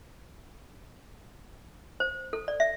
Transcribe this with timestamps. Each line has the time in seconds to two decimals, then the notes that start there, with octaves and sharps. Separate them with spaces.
2.00 C5
2.33 A4
2.48 D5
2.60 E5